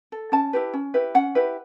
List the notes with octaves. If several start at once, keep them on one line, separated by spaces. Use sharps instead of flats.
A4
C#4 A5
E4 G4 B4
C#4
E4 G4 B4
C#4 F#5
E4 G4 B4